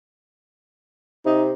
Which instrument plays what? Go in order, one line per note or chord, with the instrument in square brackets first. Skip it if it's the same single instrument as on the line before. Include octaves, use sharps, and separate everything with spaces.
[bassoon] C3 [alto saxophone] D#4